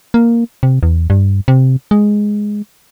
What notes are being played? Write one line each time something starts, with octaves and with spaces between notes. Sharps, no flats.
A#3
C3
E2
G2
C3
G#3